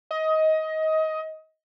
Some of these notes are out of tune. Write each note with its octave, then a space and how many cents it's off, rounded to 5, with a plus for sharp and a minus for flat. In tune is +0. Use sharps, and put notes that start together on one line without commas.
D#5 +20